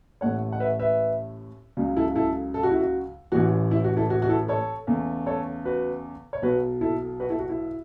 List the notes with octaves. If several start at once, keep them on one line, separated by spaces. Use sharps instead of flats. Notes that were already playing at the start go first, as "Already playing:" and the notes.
A1 A2 A3 C#5 F#5
F#5
B4 E5
B4 E5
C#2 C#3 F#3
E4 A4
E4 A4
A4
F#4
E4
F#4
A1 A2 E3 F#4
E4
F#4
E4 A4
F#4
F#4
E4 A4
A4 C#5
E2 C#3 A3
A4 C#5
F#4 B4
C#5
B1 B2 F#3 F#4 B4
E4 A4
F#4 B4
E4 A4
F#4
E4